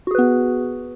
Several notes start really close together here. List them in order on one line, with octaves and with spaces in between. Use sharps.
F#4 G#4 B4 B3